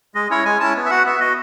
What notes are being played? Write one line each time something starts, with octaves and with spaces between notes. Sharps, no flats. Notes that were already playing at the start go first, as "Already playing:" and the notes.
G#3 D#5
C#4 E4 C#5
G#3 G#5
C#4 E4 A5
B3
E5
F#4 F#5
B3 E5
F#4 D#5